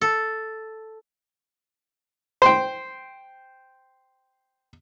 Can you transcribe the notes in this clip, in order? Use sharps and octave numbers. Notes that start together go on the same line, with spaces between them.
A4
C5 G5